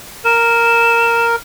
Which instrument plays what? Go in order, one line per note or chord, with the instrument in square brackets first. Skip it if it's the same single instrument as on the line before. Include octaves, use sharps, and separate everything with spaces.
[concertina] A#4 [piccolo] E7